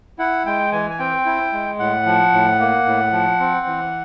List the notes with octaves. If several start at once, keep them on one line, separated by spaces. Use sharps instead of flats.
E4 F#5
G#3 G5
E3 G#5
G#5
C4 G5
E4
G#3
A2 F#5
F3
A2
A#3
A2
F3
C4
E3